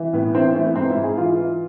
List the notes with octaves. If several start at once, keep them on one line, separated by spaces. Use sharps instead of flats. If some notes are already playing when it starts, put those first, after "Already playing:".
Already playing: E3
A2 B3
E3 C4
E3 A3
B3
G#2 C4
E4
G#2
G#4
E3 F4
E3